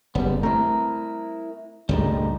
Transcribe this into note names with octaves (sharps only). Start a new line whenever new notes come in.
F#1 G3 B3
A3 C4 E4 A#4
C#2 G2 A#2 G3 A3 D#4